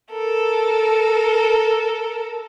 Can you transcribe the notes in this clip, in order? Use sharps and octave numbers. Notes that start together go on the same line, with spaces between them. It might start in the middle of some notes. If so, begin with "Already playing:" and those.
A4 A#4